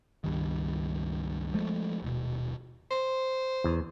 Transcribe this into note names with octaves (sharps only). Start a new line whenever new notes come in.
C#2 G2 D#3
F3 G#3 A3
D#1 B2
C5
E2